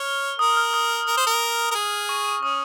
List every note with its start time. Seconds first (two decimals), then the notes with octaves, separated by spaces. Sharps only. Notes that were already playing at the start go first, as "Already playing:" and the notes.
Already playing: C#5 F6
0.39 A#4 D#6
0.57 F6
0.74 D#6
1.07 A#4
1.17 C5
1.27 A#4
1.71 A#4
1.75 G#4
2.09 C#6
2.42 C#4 D#6